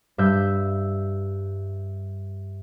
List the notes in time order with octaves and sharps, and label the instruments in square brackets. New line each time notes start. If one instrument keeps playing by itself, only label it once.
[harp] G2 E5 G6